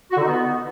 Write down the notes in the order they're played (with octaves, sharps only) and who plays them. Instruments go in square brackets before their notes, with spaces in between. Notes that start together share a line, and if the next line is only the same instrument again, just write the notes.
[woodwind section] F#4
D3
D#4
B3